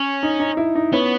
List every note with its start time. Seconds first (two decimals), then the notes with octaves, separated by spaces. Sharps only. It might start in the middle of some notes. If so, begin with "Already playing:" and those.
Already playing: C#4
0.23 D#4
0.40 D#4
0.57 E4
0.75 D#4
0.92 B3 C#4